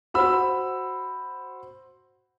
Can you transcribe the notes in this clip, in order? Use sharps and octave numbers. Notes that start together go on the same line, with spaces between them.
F#4 C5 B5 E6